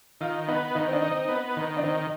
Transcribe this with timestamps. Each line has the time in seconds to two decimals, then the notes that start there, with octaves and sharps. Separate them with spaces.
0.21 D#3 F4
0.48 B3 D#4
0.75 D#3 D#4
0.88 C4
0.93 D4
1.02 D#4
1.11 C4
1.29 B3
1.57 D#3
1.77 D4
1.83 D#3 C4